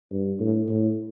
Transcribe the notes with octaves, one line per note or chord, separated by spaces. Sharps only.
G2
A2
A2